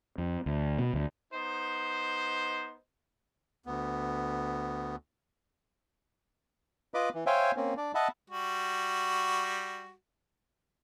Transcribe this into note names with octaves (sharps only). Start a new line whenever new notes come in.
F2
D2
B2
D2
B3 D#4 C5
D2 B3
F4 B4 D#5 B5 D6
E3
C5 C#5 E5 F5 G5 G#5
A#3 C4 C#4
D4 D5
D#5 E5 F#5 A5 B5
G3 F#4